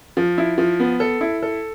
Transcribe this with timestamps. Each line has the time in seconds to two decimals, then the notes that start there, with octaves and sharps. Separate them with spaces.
0.17 F3
0.38 E4
0.58 F3
0.80 B3
1.00 A4
1.21 E4
1.42 A4